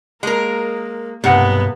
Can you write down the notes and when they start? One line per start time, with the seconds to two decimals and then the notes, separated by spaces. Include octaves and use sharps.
0.23 G#3 A#3 A#4
1.24 B1 G2 C3 A#3 B3 F#5